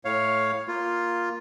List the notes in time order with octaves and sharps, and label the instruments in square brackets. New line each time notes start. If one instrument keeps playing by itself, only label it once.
[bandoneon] A2 C#5 F5
A#3 F4